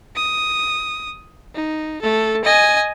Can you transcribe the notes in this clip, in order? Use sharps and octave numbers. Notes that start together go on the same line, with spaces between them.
D#6
D#4
A3 A4
D#5 G#5